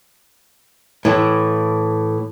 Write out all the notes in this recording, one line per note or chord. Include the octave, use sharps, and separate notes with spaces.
A2 E3